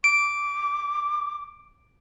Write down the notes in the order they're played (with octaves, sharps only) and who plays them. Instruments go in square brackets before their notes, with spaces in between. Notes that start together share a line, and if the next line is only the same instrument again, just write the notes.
[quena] D6 [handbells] D7